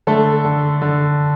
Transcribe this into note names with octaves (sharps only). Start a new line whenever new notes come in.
D3 A3 A4
D3
D3